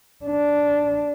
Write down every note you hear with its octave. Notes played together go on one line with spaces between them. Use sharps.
D4